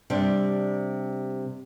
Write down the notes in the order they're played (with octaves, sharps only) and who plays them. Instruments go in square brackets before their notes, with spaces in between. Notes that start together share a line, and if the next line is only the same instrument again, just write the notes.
[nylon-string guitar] C3 G3 D4